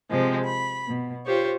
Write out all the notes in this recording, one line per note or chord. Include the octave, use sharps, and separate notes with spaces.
C3 F3 G#3 C4
B5
B2
F4 G4 C5 C#5